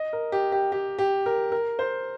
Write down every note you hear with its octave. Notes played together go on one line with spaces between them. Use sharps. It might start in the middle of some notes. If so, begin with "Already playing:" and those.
Already playing: D#5
A#4
G4
G4
G4
G4
A#4
A#4
C5